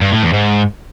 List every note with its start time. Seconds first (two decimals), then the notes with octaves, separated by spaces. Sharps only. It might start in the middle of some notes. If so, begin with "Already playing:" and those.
0.01 G2
0.12 A2
0.23 E2
0.33 G#2